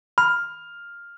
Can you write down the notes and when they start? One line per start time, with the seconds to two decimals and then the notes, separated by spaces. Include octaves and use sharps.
0.18 B5 F6